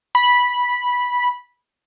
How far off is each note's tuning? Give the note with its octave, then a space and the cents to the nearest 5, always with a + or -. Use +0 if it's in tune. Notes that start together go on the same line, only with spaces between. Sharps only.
B5 -10